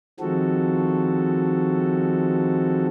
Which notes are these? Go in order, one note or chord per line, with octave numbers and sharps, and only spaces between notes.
D#3 F3 G#3 C4 F#4 A4